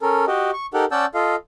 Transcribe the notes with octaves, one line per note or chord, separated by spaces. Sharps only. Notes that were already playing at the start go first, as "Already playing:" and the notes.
C#4 A4 A#4
F#4 G4 D#5
C#6
D#4 G4 A4 A#4 F#5
C#4 D5 F#5 A5 E6 G6
F4 A4 D#5 F5